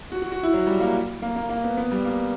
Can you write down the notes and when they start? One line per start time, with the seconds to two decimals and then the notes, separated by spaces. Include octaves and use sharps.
0.12 F#4
0.22 F#4
0.32 F#4
0.43 E4
0.53 F#3
0.67 G3
0.80 A#3
1.22 A#3
1.36 A#3
1.50 A#3
1.64 B3
1.77 B3
1.92 G3
2.05 A#3